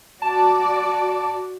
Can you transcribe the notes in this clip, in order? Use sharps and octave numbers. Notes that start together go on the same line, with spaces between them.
F#4 D5 A5